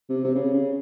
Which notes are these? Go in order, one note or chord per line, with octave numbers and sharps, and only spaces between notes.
C3
C3
C#3
C#3